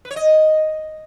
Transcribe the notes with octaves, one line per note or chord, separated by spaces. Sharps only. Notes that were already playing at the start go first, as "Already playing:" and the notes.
B4
C#5
D#5